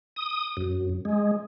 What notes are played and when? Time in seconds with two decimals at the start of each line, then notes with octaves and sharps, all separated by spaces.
0.16 D#6
0.57 F#2
1.05 G#3